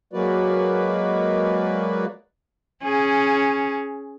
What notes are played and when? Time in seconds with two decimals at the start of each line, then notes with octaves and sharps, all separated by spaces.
0.13 F#3 G#3 A#3 F#4 B4 D5
2.83 C#4 G#4